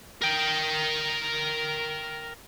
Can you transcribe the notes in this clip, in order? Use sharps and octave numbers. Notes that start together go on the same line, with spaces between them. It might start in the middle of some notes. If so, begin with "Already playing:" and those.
A#4 G5